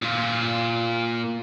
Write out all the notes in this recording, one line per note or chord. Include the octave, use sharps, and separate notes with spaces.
A#2 F4